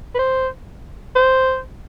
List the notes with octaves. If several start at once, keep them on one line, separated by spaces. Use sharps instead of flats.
B4
C5
C5